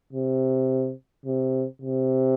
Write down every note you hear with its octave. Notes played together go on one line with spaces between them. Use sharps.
C3
C3
C3